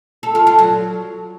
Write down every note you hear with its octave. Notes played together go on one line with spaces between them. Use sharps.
A4
F4
F4
F#3